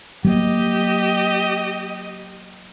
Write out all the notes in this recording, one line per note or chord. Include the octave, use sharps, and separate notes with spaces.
F#3 A#3 G4 D#5